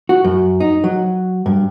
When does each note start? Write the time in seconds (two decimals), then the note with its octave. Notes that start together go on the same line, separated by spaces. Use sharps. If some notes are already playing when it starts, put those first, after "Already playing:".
0.09 F#4
0.24 F#2
0.60 D#4
0.84 F#3
1.46 G2